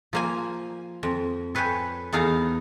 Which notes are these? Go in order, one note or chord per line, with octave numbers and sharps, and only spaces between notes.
F3 A#3 G#5
F2
A4 B4 C#5 G5 G#5
E2 B3 D#4 A4 F5 A#5